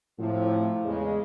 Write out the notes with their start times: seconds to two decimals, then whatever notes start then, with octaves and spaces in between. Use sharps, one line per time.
0.19 A2 C3 F3
0.84 E2 C#3 G#3